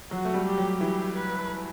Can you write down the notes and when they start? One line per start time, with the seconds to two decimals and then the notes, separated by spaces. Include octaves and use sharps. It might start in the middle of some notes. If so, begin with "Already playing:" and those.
0.10 F#3 F#4
0.25 A3
0.34 G3
0.46 G4
0.58 F#3
0.81 E3 G4
1.16 B4